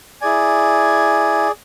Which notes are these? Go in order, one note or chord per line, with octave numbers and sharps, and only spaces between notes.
E4 G#4 D5 G#5